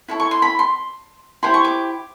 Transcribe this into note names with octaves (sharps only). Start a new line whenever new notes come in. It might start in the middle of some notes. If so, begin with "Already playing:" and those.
E4 A4 C#5
C#6
C6
B5
C6
E4 G4 C5 C6
C#6
D6